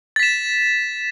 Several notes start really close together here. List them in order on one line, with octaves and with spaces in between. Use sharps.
A6 B6 E7